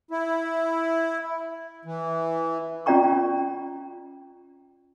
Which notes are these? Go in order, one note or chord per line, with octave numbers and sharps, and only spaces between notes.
E4
E3
C#4 F4 D5 G5 A#5 C#6